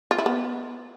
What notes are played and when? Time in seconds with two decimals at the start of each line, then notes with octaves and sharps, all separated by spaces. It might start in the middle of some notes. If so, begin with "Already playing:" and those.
0.11 F4
0.18 E4
0.26 B3